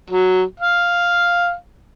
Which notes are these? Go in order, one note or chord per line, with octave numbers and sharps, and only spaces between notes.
F#3
F5